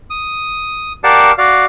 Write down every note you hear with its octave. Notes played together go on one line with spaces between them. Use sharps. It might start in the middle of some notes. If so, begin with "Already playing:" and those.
D#6
G4 A#4 D5 F5 F#5 A5
F#4 D5 F5